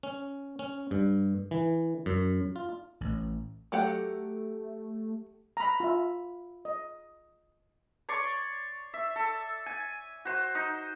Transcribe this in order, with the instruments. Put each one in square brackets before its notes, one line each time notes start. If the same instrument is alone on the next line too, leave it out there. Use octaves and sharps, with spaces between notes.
[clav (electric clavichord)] C#4
C#4
G2
E3
F#2
F4
[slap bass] A1
[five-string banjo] F#3 G4 F#5 [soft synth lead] A3
[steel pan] A#5 B5
F4 E5
D#5
[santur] C#5 D5 C6 C#6
E5
A4
G#5
F#4 C5
D#4